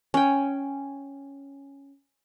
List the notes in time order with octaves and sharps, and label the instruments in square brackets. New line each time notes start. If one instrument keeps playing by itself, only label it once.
[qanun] C#4 G5